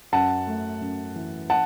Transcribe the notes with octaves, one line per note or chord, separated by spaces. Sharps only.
F#2 F#5 A5
A3
F#2
E3
F#5 A5